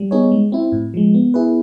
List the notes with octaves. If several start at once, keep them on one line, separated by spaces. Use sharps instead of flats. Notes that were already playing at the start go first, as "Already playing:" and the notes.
Already playing: G3
B3 D#4 G#4 C#5
G#3
C4 E4
A2
F3 G#3
B3
E4 G#4 B4